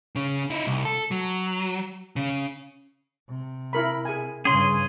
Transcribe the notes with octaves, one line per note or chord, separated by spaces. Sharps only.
C#3 C#4
D#4 E4
C2
A4
F#3
C#3 C#4
C3
E4 A#4 B5
G#4 G#5
G2 C#3 C#4 G#4 C6